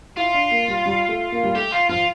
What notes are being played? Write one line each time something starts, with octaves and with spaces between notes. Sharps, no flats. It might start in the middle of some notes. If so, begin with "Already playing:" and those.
E4 F4
D4
A#3
G3
G3
A3
A#3
G3
A3 G4
F4
F3 F4